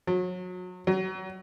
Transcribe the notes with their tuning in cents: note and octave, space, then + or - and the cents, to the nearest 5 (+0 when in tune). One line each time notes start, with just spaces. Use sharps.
F#3 -30
F#3 +30